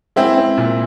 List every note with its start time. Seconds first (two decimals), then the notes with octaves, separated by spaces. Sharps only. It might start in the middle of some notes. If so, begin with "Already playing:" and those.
0.16 G#3 C4 E4
0.38 C4
0.58 A#2